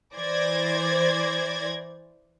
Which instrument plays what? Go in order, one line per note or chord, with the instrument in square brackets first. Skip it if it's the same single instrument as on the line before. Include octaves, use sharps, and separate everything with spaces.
[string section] E3 C5 D5 G#6 A#6